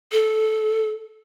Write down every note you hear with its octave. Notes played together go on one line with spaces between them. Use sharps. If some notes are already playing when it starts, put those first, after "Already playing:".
A4